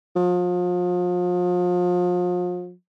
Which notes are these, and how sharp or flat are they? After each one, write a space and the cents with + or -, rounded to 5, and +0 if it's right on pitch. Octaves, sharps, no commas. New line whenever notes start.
F3 +35